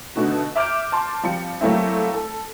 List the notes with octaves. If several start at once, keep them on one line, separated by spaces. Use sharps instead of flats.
B2 D3 A3 D#4 F#4
E5 D6 F6 G6 D7
A5 C6 D6
F3 G3 C4 C#7
F#3 G3 A3 A#3 C4 E4
A4